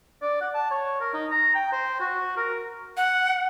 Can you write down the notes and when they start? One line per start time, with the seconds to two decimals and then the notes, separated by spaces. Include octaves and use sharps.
0.22 D5
0.41 F#5
0.55 A5
0.71 C#5
1.01 A#4
1.13 D#4
1.31 A#5
1.55 G5
1.72 C5
2.00 F#4
2.37 A#4
2.97 F#5